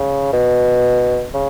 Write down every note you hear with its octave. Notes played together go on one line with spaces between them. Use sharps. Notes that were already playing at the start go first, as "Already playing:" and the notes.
Already playing: C#3
B2
C#3